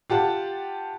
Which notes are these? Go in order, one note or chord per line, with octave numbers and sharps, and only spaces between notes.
F4 G4 F#5 A5